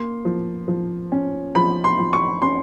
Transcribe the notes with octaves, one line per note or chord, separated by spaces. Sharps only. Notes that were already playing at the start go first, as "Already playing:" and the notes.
Already playing: A#3 C6
F3
F3
C#4
F3 B5
C6
F3
C#6
C#4 C6